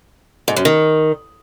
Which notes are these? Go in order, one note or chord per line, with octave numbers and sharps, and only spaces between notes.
G#2
F#2
D#3